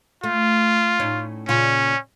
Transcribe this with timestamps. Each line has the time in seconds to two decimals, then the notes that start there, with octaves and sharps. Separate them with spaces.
0.23 A3 F4
1.00 A2 C#4 D#4
1.48 A#2 C#3 C#4 F4